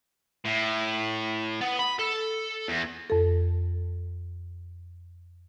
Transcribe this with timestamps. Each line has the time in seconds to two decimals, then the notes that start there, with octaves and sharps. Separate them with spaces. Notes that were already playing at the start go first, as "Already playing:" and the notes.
0.45 A2
1.61 B3
1.79 B5
1.99 A4
2.68 E2
3.10 F2 A4